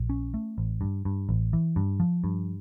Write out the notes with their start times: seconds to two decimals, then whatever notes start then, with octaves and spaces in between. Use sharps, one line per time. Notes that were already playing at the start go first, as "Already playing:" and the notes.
Already playing: A#1
0.10 C#4
0.34 A3
0.58 A1
0.81 G2
1.05 G2
1.29 A1
1.53 E3
1.76 G2
2.00 F3
2.24 G2